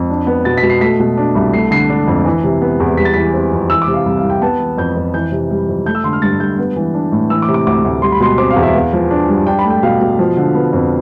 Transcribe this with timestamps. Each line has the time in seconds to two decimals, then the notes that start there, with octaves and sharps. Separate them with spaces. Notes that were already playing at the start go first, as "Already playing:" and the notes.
Already playing: F2
0.10 D4
0.27 B3
0.45 B2 A6
0.58 B6
0.63 B2
0.70 C7
0.81 A3 B6
1.00 B2
1.18 D4
1.35 C2
1.54 A3 C7
1.71 D3 C7
1.89 D4
2.08 F2
2.25 E3
2.44 C3
2.62 B3
2.80 E2
2.97 G3 B6
3.05 A6
3.14 E3 B6
3.34 C4
3.52 F2
3.70 E3 E6
3.82 D6
3.88 C3
3.94 F5
4.06 C2
4.18 F5
4.23 C2
4.30 G5
4.42 B3 A5
4.60 E3
4.78 F2 G6
4.96 F2
5.14 E3 G6
5.32 C3
5.51 G3
5.68 F2
5.86 A3 G6
5.95 E6
6.04 D3 C6
6.13 F6
6.22 G2 A6
6.40 G2 G6
6.58 B3
6.76 E3
6.94 D4
7.12 A2
7.30 E3 E6
7.42 D6
7.48 C3
7.54 D6
7.67 D2 D6
7.84 D2
8.02 G3 C6
8.12 B5
8.20 B2 C6
8.38 C4 D6
8.51 F5
8.56 E2
8.63 E5
8.74 B3 F5
8.93 F3
9.11 D4
9.29 G2
9.47 D4 G5
9.59 B5
9.64 A3
9.70 G5
9.83 B2 F5
10.01 B2
10.19 F3
10.37 D3
10.55 B3
10.73 F2